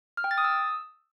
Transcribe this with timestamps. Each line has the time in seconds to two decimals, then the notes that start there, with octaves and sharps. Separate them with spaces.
0.17 F6
0.24 G5
0.31 A6
0.38 D#6
0.44 E6